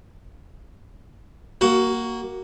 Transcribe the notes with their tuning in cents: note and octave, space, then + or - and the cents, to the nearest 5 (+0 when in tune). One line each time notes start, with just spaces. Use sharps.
A#3 +0 F#4 +15